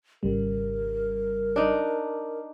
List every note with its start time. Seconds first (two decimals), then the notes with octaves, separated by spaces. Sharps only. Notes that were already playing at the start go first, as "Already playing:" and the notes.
0.23 G#1 C#3 G3 A#4
1.56 D4 D#4